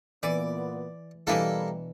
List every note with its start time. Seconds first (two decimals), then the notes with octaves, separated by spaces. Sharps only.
0.23 A#2 E3 B3 D5
1.27 B2 E3 G3 A#3 D4 E4 A4